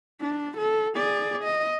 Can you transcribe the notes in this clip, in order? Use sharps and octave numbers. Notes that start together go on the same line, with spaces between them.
D4
A4
G#4 D5
D#5